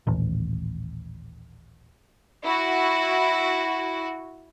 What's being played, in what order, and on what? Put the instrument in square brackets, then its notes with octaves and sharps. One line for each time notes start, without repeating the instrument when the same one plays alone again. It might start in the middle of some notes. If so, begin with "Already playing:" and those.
[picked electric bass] D#1 A1
[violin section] E4 F#4